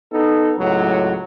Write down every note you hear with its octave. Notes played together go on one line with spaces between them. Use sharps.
B3 D#4 A4
C#2 A2 F#3